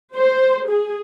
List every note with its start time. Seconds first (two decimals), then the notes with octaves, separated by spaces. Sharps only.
0.16 C5
0.68 G#4